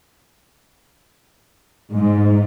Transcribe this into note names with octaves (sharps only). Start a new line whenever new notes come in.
G#2